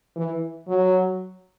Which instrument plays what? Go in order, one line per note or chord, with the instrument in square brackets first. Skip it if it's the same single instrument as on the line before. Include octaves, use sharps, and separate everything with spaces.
[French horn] E3
F#3